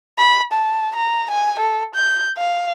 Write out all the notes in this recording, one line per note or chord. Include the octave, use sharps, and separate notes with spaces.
B5
A5
A#5
G#5
A4
G6
F5